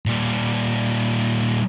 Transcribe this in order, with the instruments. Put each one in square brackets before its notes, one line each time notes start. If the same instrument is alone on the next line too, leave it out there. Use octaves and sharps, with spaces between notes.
[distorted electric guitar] A#2 G3